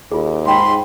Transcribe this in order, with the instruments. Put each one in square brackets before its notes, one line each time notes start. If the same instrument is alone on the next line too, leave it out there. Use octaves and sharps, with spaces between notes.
[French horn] D#2 [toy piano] F4 G#4
[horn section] G#2 B5 [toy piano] F5 G5 [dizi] C6